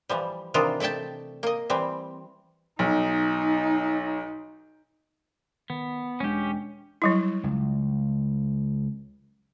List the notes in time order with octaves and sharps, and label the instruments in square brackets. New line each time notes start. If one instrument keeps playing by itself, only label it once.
[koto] E3 F3 G3
C3 D#3 E3 D4 D#4 F4
A3 D5 E5 G5 A5
A#3 D#5
E3 G3 C4
[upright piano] B1 [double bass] D#4
[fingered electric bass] D#3 [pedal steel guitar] B3
[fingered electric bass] E1 G#3 D4 [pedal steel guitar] C#4 G4
[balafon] F#3 G3 E4
[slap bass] C#2